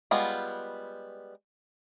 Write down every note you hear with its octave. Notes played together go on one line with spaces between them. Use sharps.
G3 G#3 B3 F4